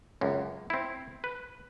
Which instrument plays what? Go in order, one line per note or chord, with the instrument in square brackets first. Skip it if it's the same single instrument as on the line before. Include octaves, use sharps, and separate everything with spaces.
[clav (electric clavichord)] C#2 F#2
C4 E4
B4